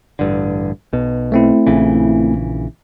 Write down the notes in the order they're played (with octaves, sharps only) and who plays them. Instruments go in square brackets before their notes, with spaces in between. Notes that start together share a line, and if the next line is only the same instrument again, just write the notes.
[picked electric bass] A1 G2 D3
B1 B2
[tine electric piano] A3 C4 E4
[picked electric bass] A#1 C#3 E3